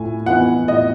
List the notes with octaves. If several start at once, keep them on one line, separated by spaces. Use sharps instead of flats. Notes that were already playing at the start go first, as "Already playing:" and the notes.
Already playing: A2 G#5
E3 B3 D#4 F#5
A2 D#5